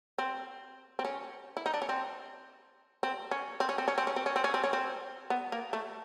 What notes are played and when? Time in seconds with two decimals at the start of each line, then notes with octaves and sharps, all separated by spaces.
0.18 C4
0.99 C4
1.05 C#4
1.57 E4
1.66 D#4
1.74 D4
1.82 C#4
1.89 C4
3.03 C4
3.31 C#4
3.60 C4
3.69 C#4
3.78 C4
3.88 C#4
3.98 C4
4.07 C#4
4.16 C4
4.26 C#4
4.36 C4
4.44 C#4
4.54 C4
4.64 C#4
4.73 C4
5.30 B3
5.52 A#3
5.73 A3